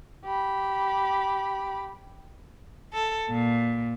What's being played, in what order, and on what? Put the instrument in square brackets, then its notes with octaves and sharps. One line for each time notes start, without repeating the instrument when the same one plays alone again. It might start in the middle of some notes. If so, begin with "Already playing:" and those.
[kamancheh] G4 B5
[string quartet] A4
A#2